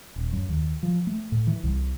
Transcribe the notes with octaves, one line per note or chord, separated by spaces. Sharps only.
D#1
F#2
D#2
F3
A3
A2
E3
C2